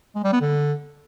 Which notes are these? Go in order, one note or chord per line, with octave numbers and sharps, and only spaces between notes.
G#3
G3
B3
D3